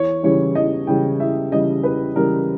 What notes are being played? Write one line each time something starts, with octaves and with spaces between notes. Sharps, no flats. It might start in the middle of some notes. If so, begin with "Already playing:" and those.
Already playing: E2 C#5
C#3 E3 G3 C#5
E2 D#5
C#3 E3 G3 G5
E2 E5
C#3 E3 G3 D#5
E2 B4
C#3 E3 G3 A#4